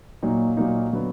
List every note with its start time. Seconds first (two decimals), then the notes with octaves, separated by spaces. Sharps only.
0.22 A#2 F#3 A#3 D#4
0.57 A#2 F#3 A#3 D#4
0.92 D3 F#3 B3